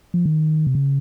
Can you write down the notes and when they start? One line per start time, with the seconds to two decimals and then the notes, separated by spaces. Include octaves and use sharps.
0.14 F3
0.26 D#3
0.67 C3
0.75 C#3